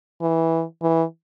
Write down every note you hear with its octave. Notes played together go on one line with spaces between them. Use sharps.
E3
E3